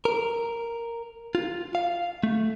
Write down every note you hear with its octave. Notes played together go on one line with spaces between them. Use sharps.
A#4
F4
F5
A3